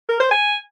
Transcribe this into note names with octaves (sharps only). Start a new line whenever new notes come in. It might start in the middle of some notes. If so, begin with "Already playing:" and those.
A#4
C5
G#5